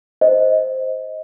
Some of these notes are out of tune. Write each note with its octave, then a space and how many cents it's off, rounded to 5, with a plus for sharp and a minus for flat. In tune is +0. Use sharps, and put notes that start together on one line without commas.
C5 +0 D#5 +15